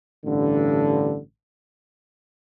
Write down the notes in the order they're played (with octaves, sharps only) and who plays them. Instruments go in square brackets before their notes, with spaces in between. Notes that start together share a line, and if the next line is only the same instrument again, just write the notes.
[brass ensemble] A1 G2 D3